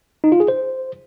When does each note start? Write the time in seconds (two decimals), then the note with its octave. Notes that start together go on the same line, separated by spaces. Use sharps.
0.24 D#4
0.32 F4
0.40 G#4
0.48 C5